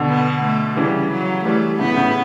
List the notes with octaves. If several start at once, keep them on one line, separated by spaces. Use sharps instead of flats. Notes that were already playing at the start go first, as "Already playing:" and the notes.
Already playing: B2 D3
B3
A3
C#3 E3 G3
F#3
E3 G3 A3
A2 C#3 B3
A2 C#3